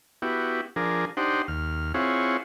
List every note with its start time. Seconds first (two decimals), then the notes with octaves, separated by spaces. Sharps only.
0.22 B3 E4 F#4 G4
0.76 F3 D4 G#4 A#4
1.17 D4 D#4 G4 C5 F#5
1.48 D#2 F6
1.94 C4 E4 F4 G#4 C#5 F#5